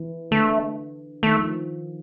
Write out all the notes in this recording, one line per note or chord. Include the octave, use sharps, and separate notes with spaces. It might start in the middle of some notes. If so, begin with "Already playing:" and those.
Already playing: E3
D3 A3
D#3 A3
F3